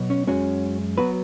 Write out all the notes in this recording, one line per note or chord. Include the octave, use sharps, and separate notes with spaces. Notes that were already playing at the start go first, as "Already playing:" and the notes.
Already playing: B2 F#3 B3
C#4
F#2 C#3 G#3 C#4 F#4
F#3 B3 F#4 B4